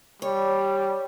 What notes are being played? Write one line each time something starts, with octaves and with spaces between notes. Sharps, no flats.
G3 C#5